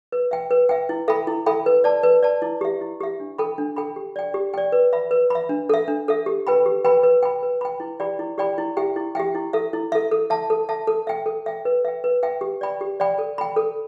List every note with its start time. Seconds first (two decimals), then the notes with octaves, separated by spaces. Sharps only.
0.12 B4
0.31 E5 G5
0.51 B4
0.69 E5 G5
0.89 E4
1.08 A4 E5 G5 B5
1.27 E4
1.46 A4 E5 G5 B5
1.66 B4
1.84 D5 A5
2.03 B4
2.23 D5 A5
2.42 E4
2.61 G4 E5
2.81 E4
3.00 G4 E5
3.20 D4
3.38 A4 G5 B5
3.58 D4
3.76 A4 G5 B5
3.96 G4
4.16 D5 G5
4.34 G4
4.54 D5 G5
4.72 B4
4.93 E5 B5
5.11 B4
5.30 E5 B5
5.49 D4
5.69 A4 E5
5.88 D4
6.08 A4 E5
6.26 G4
6.47 B4 G5 B5
6.66 G4
6.85 B4 G5 B5
7.03 B4
7.23 G5 B5
7.43 B4
7.61 G5 B5
7.80 E4
8.00 G4 D5 G5 B5
8.19 E4
8.38 G4 D5 G5 B5
8.58 E4
8.77 G4 E5 G5
8.96 E4
9.15 G4 E5 G5
9.35 E4
9.53 A4 E5
9.73 E4
9.92 A4 E5
10.11 A4
10.30 E5 A5
10.50 A4
10.69 E5 A5
10.87 A4
11.07 E5 G5
11.26 A4
11.46 E5 G5
11.65 B4
11.85 E5 G5
12.04 B4
12.23 E5 G5
12.41 G4
12.61 D5 G5 B5
12.81 G4
13.00 D5 G5 B5
13.18 A4
13.38 G5 B5
13.56 A4